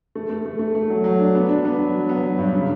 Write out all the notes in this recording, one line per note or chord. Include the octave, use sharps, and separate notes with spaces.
A3
A3
A3
A3
A3
F#3
F#3
D4
B3
D4
B3
F#3
F#3
B3
F#3
G2
C#3